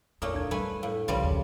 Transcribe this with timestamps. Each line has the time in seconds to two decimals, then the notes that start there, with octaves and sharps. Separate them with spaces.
0.22 F2 A#2 A3 A#3 D4 C#5 D#6
0.34 D2 D4 G#6
0.51 G3 A3 B4 G#5
0.83 A2 A4 F5
1.08 C2 C#3 F3 G3 B4 C#5 F5
1.23 D#2 G#2